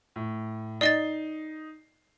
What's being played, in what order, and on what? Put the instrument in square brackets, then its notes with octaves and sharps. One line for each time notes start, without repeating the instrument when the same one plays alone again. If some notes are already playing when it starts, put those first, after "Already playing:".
[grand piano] A2
[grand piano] D#4 C7 G7 [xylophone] D5 D#5 A6